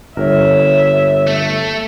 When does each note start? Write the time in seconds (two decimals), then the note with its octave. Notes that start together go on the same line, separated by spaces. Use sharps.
0.17 G1 A#4 C#5 E5
1.27 A3